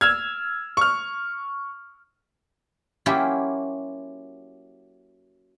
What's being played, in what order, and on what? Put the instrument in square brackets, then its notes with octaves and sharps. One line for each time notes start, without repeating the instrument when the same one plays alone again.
[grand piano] E6 F6 G#6
C#6 F6
[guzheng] F#3 A#3 C#4 E4 F4 G4